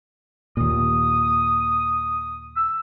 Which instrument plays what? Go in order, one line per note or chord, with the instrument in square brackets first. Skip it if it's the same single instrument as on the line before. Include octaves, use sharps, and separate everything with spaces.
[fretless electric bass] D#2 A#2 [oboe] D#6
[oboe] E6